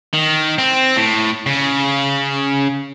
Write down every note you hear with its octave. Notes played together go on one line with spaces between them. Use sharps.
D#3
C4
A2
C#3